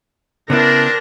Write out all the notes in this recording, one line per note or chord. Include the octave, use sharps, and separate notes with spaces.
C#3 B3 C4 D4 E4 A#4 A#6